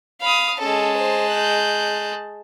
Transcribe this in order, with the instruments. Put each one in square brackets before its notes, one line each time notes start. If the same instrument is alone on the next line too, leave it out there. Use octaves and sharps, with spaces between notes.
[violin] F5 [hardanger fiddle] B5 D#6
[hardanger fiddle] G#3 A5 [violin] C#4 A4
[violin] C5
F#6 G6